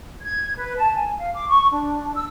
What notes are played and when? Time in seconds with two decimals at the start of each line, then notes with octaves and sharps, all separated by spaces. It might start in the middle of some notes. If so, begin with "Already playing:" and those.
0.22 G#6
0.57 B4
0.77 A5
0.95 G#5
1.19 F5
1.34 D6
1.49 C#6
1.73 D4
2.15 E6